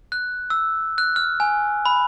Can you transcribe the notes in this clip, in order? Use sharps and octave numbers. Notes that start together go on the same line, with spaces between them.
F#6
E6
F#6
F6
G#5
B5